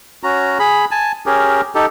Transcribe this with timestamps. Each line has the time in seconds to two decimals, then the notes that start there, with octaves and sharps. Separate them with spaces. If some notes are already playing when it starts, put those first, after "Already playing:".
0.23 C#4 F#4 A#5
0.59 G#4 B5
0.91 G#5 A5
1.26 C#4 G4 G#4 A#4
1.75 D#4 G4 A4